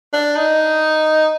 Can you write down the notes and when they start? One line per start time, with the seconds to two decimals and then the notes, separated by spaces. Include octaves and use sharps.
0.14 D4
0.36 D#4